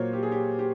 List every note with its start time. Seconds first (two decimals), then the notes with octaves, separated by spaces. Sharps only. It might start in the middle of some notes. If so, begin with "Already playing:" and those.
Already playing: A#2 F#3 A#3 C5 C#5
0.13 G4
0.23 G#4
0.32 G4
0.59 G4